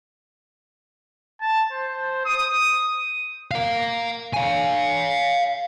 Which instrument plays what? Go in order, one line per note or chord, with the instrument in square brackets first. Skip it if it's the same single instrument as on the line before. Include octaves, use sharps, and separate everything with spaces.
[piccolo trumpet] A5
C5
D#6
[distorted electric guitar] F5 A#5
F5 G#5